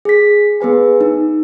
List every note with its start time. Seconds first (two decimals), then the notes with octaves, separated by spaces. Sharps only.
0.05 G#4 B6
0.61 B3 G#4 B4 G#5
1.01 D#4